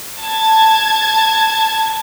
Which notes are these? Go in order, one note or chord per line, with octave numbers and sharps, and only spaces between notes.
A5 G#6